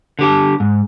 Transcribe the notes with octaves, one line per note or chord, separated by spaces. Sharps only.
D3 G4 A5
G#2